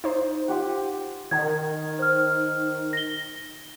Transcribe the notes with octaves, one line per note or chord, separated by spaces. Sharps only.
D#4 C5
F4 G4 F#5
D#3 G#6
C5 F6
A#6 G7